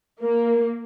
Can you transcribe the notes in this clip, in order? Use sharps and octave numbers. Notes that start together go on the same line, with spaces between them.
A#3 A#4